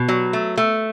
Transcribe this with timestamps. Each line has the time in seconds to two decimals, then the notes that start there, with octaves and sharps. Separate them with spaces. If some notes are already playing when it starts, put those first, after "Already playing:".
Already playing: B2
0.08 F#3
0.33 A3
0.57 A3